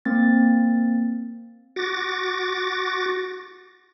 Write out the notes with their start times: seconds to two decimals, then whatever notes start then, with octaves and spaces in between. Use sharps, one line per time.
0.05 A#3 C4 A6
1.76 F#4 D6 A6 A#6